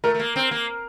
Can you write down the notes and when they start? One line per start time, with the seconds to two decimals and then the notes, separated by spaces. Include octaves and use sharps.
0.04 A3 A#4
0.14 A3
0.20 A#3
0.36 C4
0.51 A#3